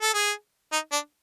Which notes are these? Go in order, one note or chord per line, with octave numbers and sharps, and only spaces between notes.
A4
G#4
D#4
D4